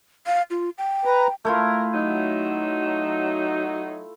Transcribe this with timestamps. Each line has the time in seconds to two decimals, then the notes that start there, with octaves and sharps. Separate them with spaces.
0.26 F5
0.51 F4
0.78 G5
1.05 B4 A#5
1.45 A3 E4 F4 A#4
1.94 F#3 D#4